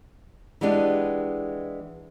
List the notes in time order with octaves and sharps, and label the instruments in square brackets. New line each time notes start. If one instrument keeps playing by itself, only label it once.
[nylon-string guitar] E3 G#3 B3 D4 G4